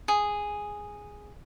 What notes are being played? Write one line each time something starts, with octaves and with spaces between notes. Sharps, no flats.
G#4